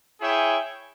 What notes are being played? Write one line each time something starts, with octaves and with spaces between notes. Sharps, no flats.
E4 G#4 C#5 E5 G5